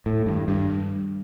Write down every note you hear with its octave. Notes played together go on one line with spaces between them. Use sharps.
A2 A4
G2 D#3
G2 D4
G3